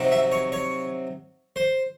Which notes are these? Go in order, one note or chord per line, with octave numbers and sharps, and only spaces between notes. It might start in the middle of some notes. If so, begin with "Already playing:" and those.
Already playing: C3 F#3 C4 D#4
E5
C#5
C#5
C5